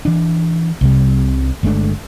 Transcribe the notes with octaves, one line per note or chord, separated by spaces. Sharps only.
E3 D4
C2 C3 G3
G1 G#3 A3 D4